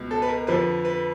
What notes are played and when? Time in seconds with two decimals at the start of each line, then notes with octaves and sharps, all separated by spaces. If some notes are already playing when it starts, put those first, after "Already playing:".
Already playing: C#2 B2
0.11 A4
0.22 B4
0.29 A#4
0.47 F2 D3 F3 B4
0.85 B4